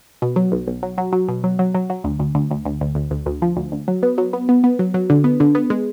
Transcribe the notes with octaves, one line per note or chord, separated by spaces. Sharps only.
B2
F#3
B1
B1
F#3
F#3
F#3
B2
F#3
F#3
F#3
F#3
D2
D2
D2
D2
D2
D2
D2
D2
D2
F3
D2
D2
F#3
B3
F#3
B3
B3
B3
F#3
F#3
D3
B3
D3
B3
G#3